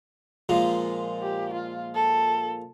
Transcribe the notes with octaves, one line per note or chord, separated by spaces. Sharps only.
A#2 F3 G#3
G4
F4
A4